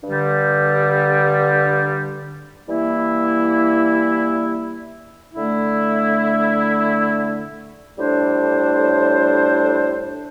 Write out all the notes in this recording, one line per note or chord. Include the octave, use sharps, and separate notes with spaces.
G2 D3 G3
E3 G3 A#3 E4
D3 A3 E4
A2 G3 D4 A4 C5